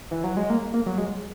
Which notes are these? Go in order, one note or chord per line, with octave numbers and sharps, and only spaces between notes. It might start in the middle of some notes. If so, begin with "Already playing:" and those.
E3
F#3
G#3
A#3
A#3
F#3
G#3